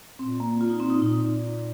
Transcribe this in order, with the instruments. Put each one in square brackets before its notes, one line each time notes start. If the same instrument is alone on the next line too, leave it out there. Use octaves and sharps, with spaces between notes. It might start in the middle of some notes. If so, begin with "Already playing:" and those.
[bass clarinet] A#2 [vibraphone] C4
[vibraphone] A#3
F4
D#4
C4
D#4
[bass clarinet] A#2 [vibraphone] D#4